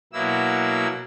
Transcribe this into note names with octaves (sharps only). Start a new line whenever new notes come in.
B2 F#3 A#3 E4 E6